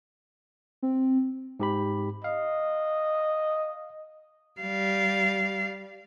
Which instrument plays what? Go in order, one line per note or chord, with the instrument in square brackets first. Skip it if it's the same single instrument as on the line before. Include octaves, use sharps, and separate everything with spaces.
[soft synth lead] C4
[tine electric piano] G#2 G4 B5
[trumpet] D#5 [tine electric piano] F5
[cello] G3 F5